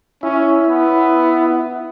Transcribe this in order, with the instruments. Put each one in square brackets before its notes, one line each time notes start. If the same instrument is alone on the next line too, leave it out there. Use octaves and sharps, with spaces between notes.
[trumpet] C#4 [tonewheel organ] E4
[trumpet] B3